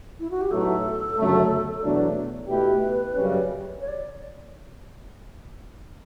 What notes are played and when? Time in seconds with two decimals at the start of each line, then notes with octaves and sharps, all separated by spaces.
0.20 E4
0.31 F#4
0.41 G4
0.50 B1 A2 F#3 A3 A4
1.17 G1 F#2 C#3 F#3 A3
1.82 E2 B2 F#3 A3 D4
2.48 B2 A3 E4 G4 B4
3.14 F#2 C#3 G3 C#4
3.81 C#5
3.88 D5